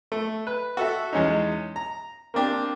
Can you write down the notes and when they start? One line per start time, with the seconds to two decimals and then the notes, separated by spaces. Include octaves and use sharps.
0.12 A3
0.47 B4
0.77 F#4 A4 E5
1.13 E2 G#3 C#4 D#4
1.76 A#5
2.34 A#3 C4 D4 G4